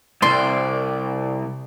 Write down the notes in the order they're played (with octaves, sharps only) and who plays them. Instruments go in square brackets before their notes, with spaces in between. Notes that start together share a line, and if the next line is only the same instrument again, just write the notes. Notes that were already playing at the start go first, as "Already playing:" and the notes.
[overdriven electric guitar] C2 G2 [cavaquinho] D5 C6